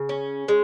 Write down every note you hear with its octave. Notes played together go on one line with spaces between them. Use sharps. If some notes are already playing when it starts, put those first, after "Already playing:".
Already playing: C#3
C#4
G#3